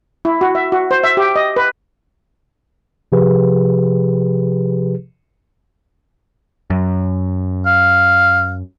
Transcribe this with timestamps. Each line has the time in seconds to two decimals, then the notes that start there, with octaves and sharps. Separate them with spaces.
0.25 E4
0.41 F#4
0.55 E5
0.72 F#4
0.91 C5
1.04 E5
1.17 G4
1.36 D#5
1.56 B4
3.12 C3 F3 G4 G#4 B4
6.70 F#2
7.66 F5